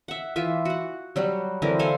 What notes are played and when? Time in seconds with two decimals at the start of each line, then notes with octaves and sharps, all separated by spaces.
0.08 E5 F#5
0.36 E3 F4 E5
0.65 F#4 F#5
1.16 F#3 G3 F#4
1.62 D3 E3 C4 A#4
1.79 A4 C5 F5 G#5